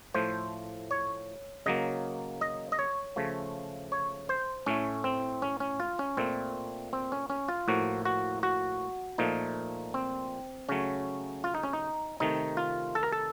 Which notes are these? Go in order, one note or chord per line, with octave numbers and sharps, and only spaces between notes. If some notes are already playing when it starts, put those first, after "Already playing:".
A2 F3 A3 C5
C#5
C#3 F#3 A#3 D#5
D#5
D#5
C#5
C#3 F3 A3
C#5
C5
A2 A3 C#4
C4
C#4
C#4
F4
C#4
A#2 A3 C4
C4
C#4
C#4
F4
A2 F3 A#3 F#4
F#4
F#4
A#2 F3 A3 D#4
C4
C#3 F#3 A3 C#4
F4
D#4
C#4
D#4
C3 D#3 A3 D#4
F4
A4
A#4
A4